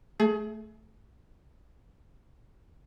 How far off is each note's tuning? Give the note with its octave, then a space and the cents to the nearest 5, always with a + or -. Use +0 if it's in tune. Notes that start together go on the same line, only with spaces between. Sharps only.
A3 +0 G#4 +30